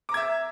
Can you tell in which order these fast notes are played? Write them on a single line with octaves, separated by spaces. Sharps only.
D6 A#5 G#6 E5